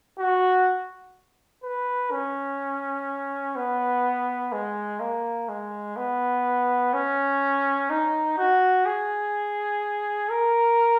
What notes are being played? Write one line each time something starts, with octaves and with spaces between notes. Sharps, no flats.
F#4
B4
C#4
B3
G#3
A#3
G#3
B3
C#4
D#4
F#4
G#4
A#4